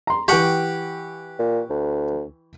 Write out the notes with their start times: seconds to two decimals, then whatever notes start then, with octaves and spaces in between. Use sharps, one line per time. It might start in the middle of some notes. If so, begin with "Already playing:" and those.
0.07 A#5 C6
0.28 E3 G4 F#5 G5 C#6
1.39 A#2
1.70 D2